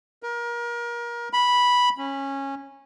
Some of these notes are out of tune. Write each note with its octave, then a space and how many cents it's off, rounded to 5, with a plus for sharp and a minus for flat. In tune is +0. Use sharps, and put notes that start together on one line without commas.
A#4 +30
B5 -5
C#4 -15